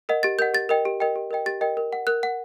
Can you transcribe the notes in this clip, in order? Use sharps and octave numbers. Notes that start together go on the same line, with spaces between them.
A#4 D#5 F#5
G4 A6
A#4 D#5 F#5 G6
G4 A6
A#4 D#5 G5
G4
A#4 D#5 G5
G4
A#4 D#5 G5
G4 A6
A#4 D#5 G5
A#4
F#5
A#4 F#6
F#5